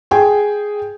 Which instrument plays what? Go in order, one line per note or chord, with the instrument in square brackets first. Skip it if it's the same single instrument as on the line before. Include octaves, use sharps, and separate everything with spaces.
[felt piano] G#4 G5 G#5